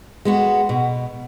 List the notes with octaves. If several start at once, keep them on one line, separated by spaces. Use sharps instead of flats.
G#3 B3 F#4
B2